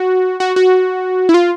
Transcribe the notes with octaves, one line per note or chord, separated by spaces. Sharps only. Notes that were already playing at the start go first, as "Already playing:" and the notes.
Already playing: F#4
F#4
F#4
E4
F4